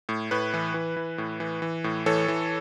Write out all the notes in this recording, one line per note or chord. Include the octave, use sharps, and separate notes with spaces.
A2
A2 B4
E3
E3
E3
A2
E3
E3
A2
E3 A4 C#5
E3